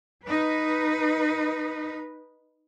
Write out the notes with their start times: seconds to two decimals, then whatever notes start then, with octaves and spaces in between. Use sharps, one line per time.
0.24 D#4 B4